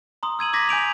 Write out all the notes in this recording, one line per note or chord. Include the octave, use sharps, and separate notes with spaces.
A#5 C6 D#6
E6 G#6 D#7 F#7
D6 G#6 A#6 B6
G#5 G6 D7 F7